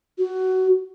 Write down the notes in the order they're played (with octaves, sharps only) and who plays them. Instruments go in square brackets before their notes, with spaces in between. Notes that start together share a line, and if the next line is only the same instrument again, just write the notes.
[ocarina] F#4